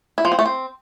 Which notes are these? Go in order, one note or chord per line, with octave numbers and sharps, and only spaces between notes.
E4
F3
C4
A3
C4